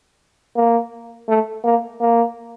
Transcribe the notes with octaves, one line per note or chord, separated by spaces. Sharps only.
A#3
A3
A#3
A#3